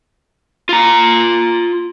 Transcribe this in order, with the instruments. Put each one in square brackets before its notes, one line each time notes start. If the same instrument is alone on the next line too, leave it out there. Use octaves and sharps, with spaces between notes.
[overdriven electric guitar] F4 A#5